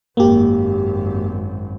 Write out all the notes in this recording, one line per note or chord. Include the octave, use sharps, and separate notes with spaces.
G#1 F#2 A#3 G4